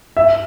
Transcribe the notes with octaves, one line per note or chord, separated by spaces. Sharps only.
E5